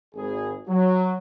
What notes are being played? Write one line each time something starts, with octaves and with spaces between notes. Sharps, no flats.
G#1 G#4
F#3